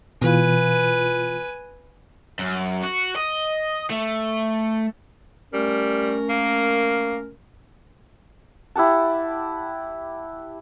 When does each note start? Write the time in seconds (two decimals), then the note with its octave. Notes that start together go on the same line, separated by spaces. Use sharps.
0.22 B2 E3 F4 B4 G#5
2.39 F#2
2.83 F#4
3.16 D#5
3.90 A3
5.54 G3 A3 C#4 A#4
6.29 A#3
8.75 E4 G4 F#5 A5